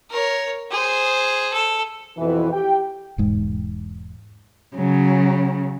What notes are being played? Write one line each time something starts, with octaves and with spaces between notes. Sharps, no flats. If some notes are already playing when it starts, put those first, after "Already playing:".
A#4 C#5
G#4 C5
A4
F2 B2 E3
G4 G5
E1 G#2
C#3 F#3